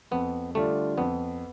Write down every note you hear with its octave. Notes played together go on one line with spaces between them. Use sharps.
F2 B3
D3 G3 A3 D4 F4
F2 B3